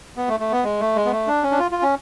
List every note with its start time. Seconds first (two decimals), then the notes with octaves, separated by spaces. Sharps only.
0.17 B3
0.28 A3
0.40 A3
0.52 B3
0.64 G#3
0.80 A3
0.96 G#3
1.05 B3
1.12 A3
1.27 D4
1.43 C#4
1.52 D4
1.59 F4
1.71 F4
1.82 C#4